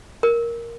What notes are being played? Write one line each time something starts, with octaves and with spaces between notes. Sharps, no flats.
A#4